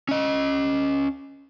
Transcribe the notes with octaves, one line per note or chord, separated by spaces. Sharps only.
C#4 D#5